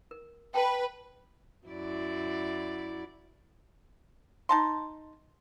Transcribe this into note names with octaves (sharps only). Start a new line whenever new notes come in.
A#4
B4 G5 A5
F#2 E4 D5
D#4 A5 C6